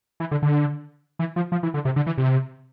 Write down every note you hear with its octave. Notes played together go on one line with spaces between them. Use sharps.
E3
D3
D3
E3
F3
F3
E3
D3
C3
D3
E3
C3